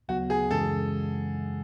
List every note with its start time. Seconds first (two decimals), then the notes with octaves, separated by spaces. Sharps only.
0.09 D2 C#3 F#3 B3 F#4
0.30 G#4
0.51 F#2 C#3 E3 G#3 A4